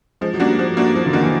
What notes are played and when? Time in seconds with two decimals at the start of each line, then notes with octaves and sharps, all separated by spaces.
0.21 F3 G#3
0.34 F#3
0.40 G3 A#3 D4 F#4
0.59 F3
0.77 A#3 D4 F#4
0.95 F3 F#3
1.06 D3
1.13 D#3 A#3 D4 F#4
1.23 E3